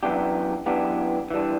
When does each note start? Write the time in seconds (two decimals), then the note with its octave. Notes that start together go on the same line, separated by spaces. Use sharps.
0.03 F#2 E3 B3 D4 G4
0.66 F#2 E3 B3 D4 G4
1.31 E3 G3 D4